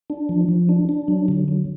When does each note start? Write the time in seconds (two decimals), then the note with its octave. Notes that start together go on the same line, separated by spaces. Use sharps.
0.10 D4
0.29 F3
0.49 F3
0.69 D4
0.89 D4
1.08 F#3
1.28 D3
1.48 F#3